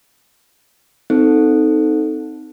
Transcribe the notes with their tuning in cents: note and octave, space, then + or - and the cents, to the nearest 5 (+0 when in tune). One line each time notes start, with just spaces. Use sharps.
C4 -20 D#4 +0 A4 +0